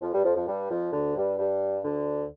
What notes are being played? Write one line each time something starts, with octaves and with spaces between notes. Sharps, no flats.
F2 F3
G2 G3
F2 F3
F2 F3
G2 G3
F2 F3
D2 D3
G2 G3
G2 G3
D2 D3